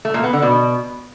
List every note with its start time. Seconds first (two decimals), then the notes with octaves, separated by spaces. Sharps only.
0.05 A3
0.14 A#2
0.24 B3
0.33 D3
0.42 B2